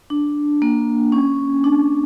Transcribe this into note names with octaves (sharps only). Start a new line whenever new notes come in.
D4
A#3
C#4
D4